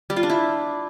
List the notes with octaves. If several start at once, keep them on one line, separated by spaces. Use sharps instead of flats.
G3
F4
D4
E4